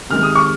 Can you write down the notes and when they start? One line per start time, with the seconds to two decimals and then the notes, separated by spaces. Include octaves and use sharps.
0.10 C3 D#3 G#3 F6
0.23 D#6
0.36 C#6